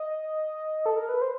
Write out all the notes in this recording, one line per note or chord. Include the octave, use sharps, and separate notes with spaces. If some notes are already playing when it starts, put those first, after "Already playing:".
Already playing: D#5
A4
A#4
B4
C5